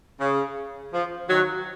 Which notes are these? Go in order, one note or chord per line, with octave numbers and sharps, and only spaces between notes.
C#3
F3
D#3 F#3